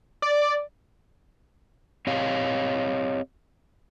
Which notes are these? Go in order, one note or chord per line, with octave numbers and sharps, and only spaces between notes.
D5
C4 G4 C#5 D#5 F5